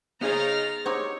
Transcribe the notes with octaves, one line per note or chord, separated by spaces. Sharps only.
C#3 B3 D#4 G#4 C5 A#5 F6 A6
C4 D#4 G4 C#5